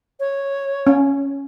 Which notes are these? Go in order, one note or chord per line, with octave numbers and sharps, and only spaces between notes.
C#5
C#4